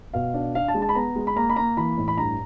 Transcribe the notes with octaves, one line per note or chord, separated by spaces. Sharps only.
B2 F5
D4
D4 F5
A5
G#3
A5
B5
B3 A#5
G#3
B5
A#3 A#5
B5
A#3 A#5
E3 B5
A2
B5
G2 A#5